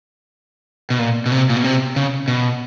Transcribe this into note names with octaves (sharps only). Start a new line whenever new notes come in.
B2
A#2
B2
C3
A#2
B2
C3
C#3
B2